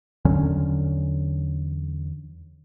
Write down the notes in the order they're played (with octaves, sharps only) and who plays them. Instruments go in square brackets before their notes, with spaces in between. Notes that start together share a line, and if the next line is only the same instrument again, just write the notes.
[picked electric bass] E2 D3 F#3 C#4